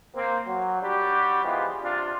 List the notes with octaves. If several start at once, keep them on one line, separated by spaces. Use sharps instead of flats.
A#3 C4
F#3
G3 D4 F#4 G4
E3 F3 G#3 B3 F4
C3 D4 F4